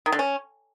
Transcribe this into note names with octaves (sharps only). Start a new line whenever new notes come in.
D#3
D3
C#4